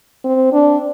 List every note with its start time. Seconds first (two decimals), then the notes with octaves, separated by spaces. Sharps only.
0.24 C4
0.52 D4